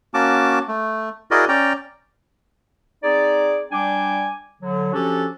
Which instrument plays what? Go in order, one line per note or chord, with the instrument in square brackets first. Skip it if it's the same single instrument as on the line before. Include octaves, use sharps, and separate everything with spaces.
[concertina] A#3 C#4 F#4 A5 D6
A3
E4 F#4 G#4 A#4 D5 D#5
C#4 D5 G5 A#5
[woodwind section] C4 D#4 G#4 D5
G3 D4 G5 G#5 D6
D3 F#3
F3 C#4 D4 F#4 G4 A4